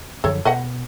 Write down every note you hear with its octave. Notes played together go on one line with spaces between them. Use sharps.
F#2 D3 F3 A4 C#5
B2 B4 D#5 F#5